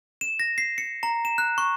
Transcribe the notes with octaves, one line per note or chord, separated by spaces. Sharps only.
E7
A#6
C7
C#7
A#5
E7
F#6
C#6